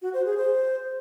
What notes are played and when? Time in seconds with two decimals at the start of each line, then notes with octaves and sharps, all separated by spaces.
0.02 F#4
0.14 C5
0.25 G#4
0.37 C5